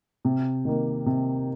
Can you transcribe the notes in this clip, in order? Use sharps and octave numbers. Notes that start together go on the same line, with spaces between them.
C3
D#3 A#3
C3